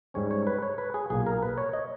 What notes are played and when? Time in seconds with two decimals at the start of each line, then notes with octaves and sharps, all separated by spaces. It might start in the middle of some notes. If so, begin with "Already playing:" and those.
0.14 G#2 G3 C#4 C#5
0.31 C#5
0.47 B4
0.63 C#5
0.78 B4
0.94 G#4
1.10 B1 A#2 A#3 G#4
1.26 A#4
1.43 B4
1.58 C#5
1.73 D#5